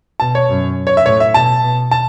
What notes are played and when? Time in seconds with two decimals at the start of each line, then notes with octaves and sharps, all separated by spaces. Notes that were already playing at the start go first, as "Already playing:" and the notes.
0.20 B2 A5
0.35 C#5
0.49 F#2
0.87 C#5
0.97 E5
1.06 A2 C#5
1.20 E5
1.34 B2 A5
1.63 B2
1.91 A5